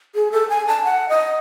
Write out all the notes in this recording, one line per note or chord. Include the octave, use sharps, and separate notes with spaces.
G#4
A4
G#5
A5
F#5
D#5